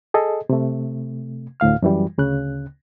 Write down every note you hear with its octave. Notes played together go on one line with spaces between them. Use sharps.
G#4 A4 D#5
C3 A3
D2 A2 F5 F6
F#2 E3 G3
D2 C#3 F#6